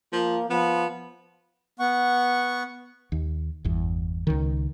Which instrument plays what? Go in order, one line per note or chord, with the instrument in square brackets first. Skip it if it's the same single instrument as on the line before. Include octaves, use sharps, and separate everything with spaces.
[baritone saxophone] F3 [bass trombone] A#3
[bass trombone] F3 [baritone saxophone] B3
[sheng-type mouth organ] B3 F#5 C#6
[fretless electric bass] D#2
G1 E2
C#2 D#3